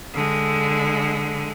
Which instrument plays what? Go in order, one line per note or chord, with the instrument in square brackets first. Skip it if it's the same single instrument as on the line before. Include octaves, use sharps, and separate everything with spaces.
[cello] D3 G#3